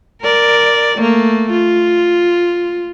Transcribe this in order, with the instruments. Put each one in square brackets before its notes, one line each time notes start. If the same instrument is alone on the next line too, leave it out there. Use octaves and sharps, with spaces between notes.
[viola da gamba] A#4 D5
A3 A#3
F4